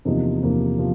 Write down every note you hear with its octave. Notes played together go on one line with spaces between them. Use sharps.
E2 C3 F3 A#3 D#4
E2 C3 F3 A#3 D#4
C3 F3